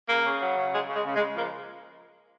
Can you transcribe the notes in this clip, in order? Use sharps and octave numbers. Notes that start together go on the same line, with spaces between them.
C#3 A#3
C#3
F#3
C#3
C#3 G#3
C#3 G#3
C#3
G#3
C#3
F3 A#3